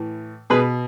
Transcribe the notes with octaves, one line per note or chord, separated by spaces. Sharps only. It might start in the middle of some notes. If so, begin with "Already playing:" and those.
Already playing: A2 E3
B2 G#4 B4